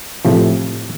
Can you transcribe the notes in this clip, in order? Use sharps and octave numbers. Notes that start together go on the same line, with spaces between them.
A2 C3 F3